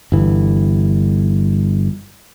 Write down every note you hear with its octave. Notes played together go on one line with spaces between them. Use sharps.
G1 E3